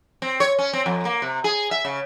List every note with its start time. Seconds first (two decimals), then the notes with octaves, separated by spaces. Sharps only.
0.22 C4
0.40 C#5
0.59 C#4
0.73 C4
0.86 F2
1.05 A#3
1.22 C3
1.44 G#4
1.71 E5
1.85 C#3